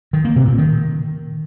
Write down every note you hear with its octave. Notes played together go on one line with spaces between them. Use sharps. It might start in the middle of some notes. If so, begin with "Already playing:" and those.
D#3
A#3
C3
A#2
D#3